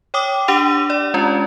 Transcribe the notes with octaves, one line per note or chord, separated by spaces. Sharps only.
C#5 G5 D6 D#6
D4 G4 F#5 D6 D#7 F7
D5
G#3 C#4 F4 D5